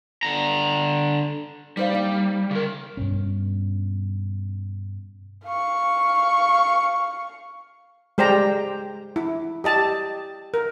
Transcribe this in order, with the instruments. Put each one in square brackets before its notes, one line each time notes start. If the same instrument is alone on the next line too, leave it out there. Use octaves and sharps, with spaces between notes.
[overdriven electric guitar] D3 A#5
[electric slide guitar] G3 [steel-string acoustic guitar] D#4 C5 F5
[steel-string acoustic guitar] A#3 D#4
[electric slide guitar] C#3 A#4
[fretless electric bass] G2 B2 C#4
[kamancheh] F5 C#6
[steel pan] G#3 G4 C5 D5 G5 A#5
E4
G4 D#5 A5
A#4